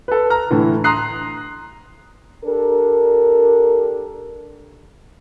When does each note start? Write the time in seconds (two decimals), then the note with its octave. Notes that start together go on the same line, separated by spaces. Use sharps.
0.08 A4 B4
0.30 A#5 F6
0.51 A2 D3 E3
0.84 A#5 C6 D#6 F#6 C7
2.44 D4 G4 A4 A#4